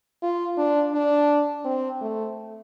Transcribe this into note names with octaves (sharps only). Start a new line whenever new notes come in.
F4
D4
D4
C4
A3